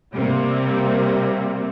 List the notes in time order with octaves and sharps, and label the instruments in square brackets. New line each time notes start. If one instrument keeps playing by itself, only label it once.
[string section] C3 G3 A#3 C4